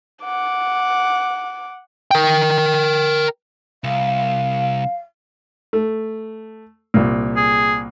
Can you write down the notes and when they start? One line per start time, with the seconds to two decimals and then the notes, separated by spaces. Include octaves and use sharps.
0.25 F#5 D6
2.11 A#4 G5
3.84 C2 F5
5.73 A3
6.94 C2 A#2
7.36 G#4